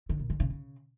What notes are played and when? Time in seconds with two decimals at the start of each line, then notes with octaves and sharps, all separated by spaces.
0.09 D3
0.20 A#2
0.30 D3
0.40 C#3
0.50 C#3